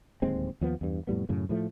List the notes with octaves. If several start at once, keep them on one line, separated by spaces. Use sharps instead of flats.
D1 D#2 G#3 C4
D#2 F3 B3
E2 G2
F2 A2 G3 B3
F#2 A2 C#3
A2 F3 A3